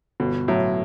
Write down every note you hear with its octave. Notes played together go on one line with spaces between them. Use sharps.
G1 B2
A2 F#3